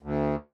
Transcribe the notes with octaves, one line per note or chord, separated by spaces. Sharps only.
D2